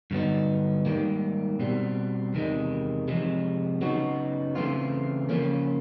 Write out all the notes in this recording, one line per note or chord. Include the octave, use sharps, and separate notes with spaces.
G2 D3 F#3 B3 D#4
G#2 D#3 G3 A#3
B2 G3 C4
E2 C3 D#3 G#3
C3 F3 G#3
C#3 F#3 B3 D#4 F#4
C#3 E3 A3 C4 F4
C#3 F3 A#3 C#4